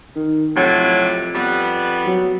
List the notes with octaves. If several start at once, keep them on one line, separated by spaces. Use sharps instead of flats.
D#3
F2 A2 C3 F#3
G3 B3
F#3